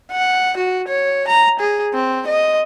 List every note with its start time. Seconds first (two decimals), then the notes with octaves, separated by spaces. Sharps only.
0.12 F#5
0.57 F#4
0.88 C#5
1.28 A#5
1.59 G#4
1.94 C4
2.27 D#5